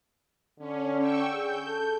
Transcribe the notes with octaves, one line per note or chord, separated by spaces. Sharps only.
D3 C#4
G5 C#6 E6
G#4 G6
A4